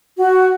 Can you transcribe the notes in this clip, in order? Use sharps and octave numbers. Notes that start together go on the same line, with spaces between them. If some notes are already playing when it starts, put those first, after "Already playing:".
F#4